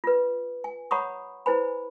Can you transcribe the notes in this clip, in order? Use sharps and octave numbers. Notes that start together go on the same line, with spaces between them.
F4 B4
G#5
C#5 F#5 A#5 B5 C#6 D#6
E4 B4 C5 G#5 B5